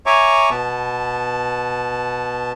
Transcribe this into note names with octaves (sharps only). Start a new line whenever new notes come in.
C#5 E5 G#5 A#5 C#6 D6
B2 B3 A5